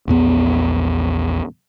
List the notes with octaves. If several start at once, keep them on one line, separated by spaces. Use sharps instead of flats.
A#1 E2 B3